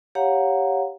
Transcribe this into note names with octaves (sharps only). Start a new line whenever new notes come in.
G4 C#5 F5 F#5 A#5